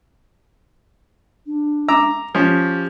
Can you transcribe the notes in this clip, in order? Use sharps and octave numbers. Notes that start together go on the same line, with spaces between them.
D4
A#5 D6 E6
F3 C#4 G4